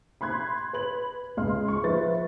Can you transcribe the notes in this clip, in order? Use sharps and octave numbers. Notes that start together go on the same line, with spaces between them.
B5 C6 F#6 G#6
B4 B5 F#7
C#2 D#5 C6 F6
C#6
F3 B4 E5 A6